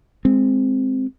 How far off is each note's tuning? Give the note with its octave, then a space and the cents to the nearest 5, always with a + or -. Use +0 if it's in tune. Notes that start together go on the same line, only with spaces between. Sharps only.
G#3 +0 C4 +0